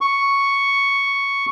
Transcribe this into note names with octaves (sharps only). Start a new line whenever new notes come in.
C#6